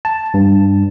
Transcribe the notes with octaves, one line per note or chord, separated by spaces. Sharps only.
A5
G2